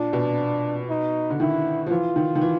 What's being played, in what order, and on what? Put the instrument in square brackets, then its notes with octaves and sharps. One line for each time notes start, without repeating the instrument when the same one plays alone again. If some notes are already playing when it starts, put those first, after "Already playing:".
Already playing: [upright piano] A#2 [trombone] D4
[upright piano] B2
[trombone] D#4
[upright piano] D3
[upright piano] D#3 [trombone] E4
[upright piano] F3
[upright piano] E3 [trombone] F4
[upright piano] D#3
D#3
E3